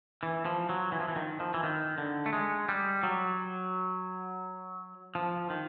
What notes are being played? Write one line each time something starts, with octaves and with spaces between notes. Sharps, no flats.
E3
F3
F#3
E3
F3
E3
D#3
F3
E3
D#3
D3
A3
G#3
G3
F#3
F3
D#3